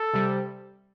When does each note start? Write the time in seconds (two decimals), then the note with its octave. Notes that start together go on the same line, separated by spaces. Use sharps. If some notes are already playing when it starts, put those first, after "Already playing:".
Already playing: A4
0.13 C3 G3